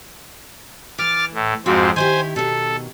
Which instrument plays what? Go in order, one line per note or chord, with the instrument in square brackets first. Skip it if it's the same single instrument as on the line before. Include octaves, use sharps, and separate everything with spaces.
[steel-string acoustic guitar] E3 [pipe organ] D6 F6 A6
[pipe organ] A2
[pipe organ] F2 G#2 C4 [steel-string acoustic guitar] F#4 F5
[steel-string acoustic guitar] D#3 E4 G4 [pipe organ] C5 G#5
[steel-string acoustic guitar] B2 D#3 [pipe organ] A4